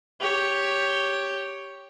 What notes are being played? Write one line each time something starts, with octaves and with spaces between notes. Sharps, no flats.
G4 C#5